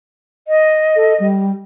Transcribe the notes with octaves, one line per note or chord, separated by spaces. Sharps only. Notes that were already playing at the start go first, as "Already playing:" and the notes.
D#5
A4
G3